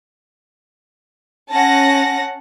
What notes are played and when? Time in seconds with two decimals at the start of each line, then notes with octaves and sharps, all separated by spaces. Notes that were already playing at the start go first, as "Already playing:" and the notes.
1.51 C#4 F#5 A5 A#6